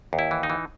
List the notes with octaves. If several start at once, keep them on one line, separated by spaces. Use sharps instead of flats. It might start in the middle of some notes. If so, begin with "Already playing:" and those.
D#2
E4
E3
D#4
E3